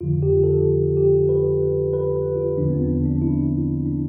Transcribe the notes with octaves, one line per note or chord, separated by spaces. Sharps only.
F2 D3 F3 F4
G4
A4
G4
B4
B4
F4
E2 D3 F3 D4
B3
C4
D4
D4
E4
D4